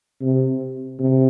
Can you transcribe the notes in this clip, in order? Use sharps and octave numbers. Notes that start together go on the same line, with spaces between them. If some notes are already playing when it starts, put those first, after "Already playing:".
C3
C3